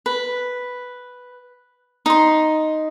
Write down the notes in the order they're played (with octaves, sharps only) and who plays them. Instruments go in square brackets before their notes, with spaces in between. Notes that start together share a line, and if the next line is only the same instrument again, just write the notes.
[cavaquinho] B4
D#4 C6